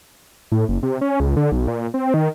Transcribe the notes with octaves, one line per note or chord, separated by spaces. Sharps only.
A2
F#1
C3
C#4
C#2
D3
B1
A#2
C4
D#3